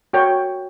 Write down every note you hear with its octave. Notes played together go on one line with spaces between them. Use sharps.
F#4 A#4 C#5 G5